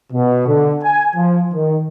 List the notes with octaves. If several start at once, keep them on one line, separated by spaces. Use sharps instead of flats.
B2
D3
G#5
F3
D#3